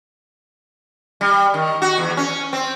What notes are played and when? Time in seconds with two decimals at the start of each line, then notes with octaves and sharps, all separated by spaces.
1.21 G3
1.54 D#3
1.82 F#4
1.98 E2
2.17 C#4
2.53 C4